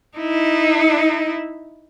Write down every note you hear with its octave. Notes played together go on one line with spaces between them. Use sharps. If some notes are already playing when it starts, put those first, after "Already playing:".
D#4 E4